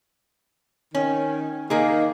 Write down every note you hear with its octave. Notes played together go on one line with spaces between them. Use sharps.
D#3 C#4
D#3 A#3 D#4 G#4